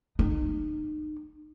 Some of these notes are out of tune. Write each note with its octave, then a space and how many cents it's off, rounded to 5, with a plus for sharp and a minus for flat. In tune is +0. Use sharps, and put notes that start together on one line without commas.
D#4 -35